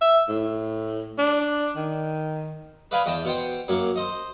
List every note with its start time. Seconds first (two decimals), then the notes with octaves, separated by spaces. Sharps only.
0.01 E5
0.28 A2
1.18 D4
1.76 D#3
2.91 B4 D5 D#5 F5 G#5 B5
3.06 E2 D#5 G5 A5
3.25 B2 C5 G5
3.68 F#2 F#3 A#3
3.96 C5 D#5